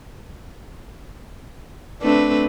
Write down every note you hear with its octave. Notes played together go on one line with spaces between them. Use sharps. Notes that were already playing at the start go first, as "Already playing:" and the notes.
A3 C4 D4 B4